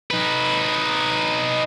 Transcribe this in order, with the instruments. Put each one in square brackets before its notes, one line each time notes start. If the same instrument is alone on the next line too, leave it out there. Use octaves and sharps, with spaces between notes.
[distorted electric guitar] D#4 B4